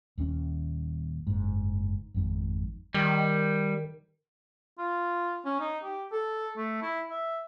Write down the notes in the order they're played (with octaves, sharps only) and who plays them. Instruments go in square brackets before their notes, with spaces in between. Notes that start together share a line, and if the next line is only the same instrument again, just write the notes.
[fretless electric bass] D#1 D#2 C4 C#4
F#1 G#2
G#1 F2 G#2
[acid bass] D#3 [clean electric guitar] G3
[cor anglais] F4
C#4
D#4
G4
A4
A3
E4
E5